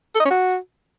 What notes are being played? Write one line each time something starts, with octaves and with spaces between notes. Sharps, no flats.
A4
D#5
C#4
F#4